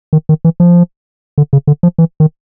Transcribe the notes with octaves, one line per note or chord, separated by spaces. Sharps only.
D#3
D#3
E3
F3
D3
C#3
D3
F3
E3
D#3